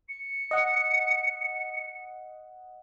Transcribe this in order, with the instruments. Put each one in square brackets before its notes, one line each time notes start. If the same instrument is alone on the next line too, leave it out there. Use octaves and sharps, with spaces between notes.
[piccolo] C#7
[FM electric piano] D#5 F#5